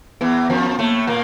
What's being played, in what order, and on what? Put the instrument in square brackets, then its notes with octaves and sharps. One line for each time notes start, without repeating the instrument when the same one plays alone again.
[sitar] E2 E3 [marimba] B3
[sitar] F2 F3
[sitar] A2 A3 [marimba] A#3
[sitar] A#2 A#3